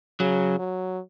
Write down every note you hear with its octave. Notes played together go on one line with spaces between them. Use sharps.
C#3 F#3
F#3